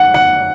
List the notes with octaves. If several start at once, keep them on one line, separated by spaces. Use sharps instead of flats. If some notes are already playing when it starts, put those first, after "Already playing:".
Already playing: F#5
F#5